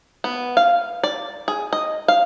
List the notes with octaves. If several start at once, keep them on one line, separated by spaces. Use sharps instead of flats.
B3
F5
D5
G#4
D#5
F5